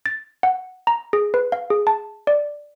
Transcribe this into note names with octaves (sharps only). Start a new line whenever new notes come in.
A6
F#5
A#5
G#4
B4
F5
G#4
A5
D5